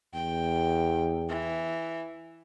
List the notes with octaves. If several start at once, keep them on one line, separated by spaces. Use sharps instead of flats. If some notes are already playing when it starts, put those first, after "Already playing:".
E2 G5
E3